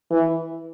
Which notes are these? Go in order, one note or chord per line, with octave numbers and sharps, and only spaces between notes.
E3